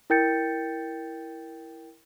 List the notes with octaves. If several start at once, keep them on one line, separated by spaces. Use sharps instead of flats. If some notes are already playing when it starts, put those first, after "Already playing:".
E4 A#4 G5 G6 A6 C#7